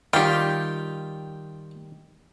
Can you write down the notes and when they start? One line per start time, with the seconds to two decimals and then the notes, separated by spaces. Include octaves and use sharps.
0.13 D#3 G3 F4 G4 G5